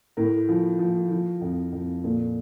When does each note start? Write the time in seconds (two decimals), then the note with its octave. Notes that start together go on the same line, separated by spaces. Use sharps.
0.17 A2 A#4
0.49 F3
0.79 F3
1.11 F3
1.41 F2
1.73 F2
2.04 A#2 A4